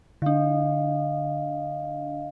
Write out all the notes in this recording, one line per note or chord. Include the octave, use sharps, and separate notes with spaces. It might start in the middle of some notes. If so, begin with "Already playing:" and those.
D3 D4 D#5 F5